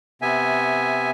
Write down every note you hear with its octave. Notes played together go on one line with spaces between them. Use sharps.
C3 B3 E5 G#5